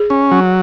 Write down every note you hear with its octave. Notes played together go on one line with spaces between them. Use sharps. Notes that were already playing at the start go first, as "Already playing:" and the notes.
Already playing: G#4
C#4
F#3